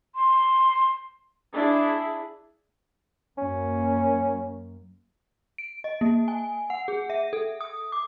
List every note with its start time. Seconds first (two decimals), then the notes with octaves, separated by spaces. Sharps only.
0.15 C6
1.53 D4 E4 G#4
3.38 F#2 A#3 C#4
5.58 D7
5.84 D#5
6.01 A#3
6.28 G#5
6.70 F#5
6.88 G#4
7.10 E5
7.33 A4
7.61 D#6
7.92 D6